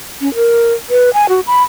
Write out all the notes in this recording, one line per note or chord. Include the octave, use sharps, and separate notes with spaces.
C#4
A#4
B4
G#5
F#4
B5